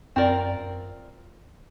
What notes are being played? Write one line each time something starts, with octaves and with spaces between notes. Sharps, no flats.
F#2 C4 F4 A#4 D5